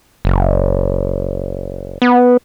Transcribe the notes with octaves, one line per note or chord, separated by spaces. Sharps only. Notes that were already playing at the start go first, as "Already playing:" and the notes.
F#1
B3